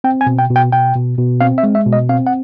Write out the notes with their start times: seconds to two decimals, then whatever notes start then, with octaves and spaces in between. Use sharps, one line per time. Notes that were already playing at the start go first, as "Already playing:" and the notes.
0.04 C4 G5
0.21 G#5
0.27 B2
0.39 G5
0.50 B2
0.56 G5
0.72 B2 G5
0.95 B2
1.18 B2
1.41 C4 F5
1.58 E5
1.63 G#3
1.75 E5
1.86 B2
1.93 D#5
2.09 C4 F5
2.27 F#5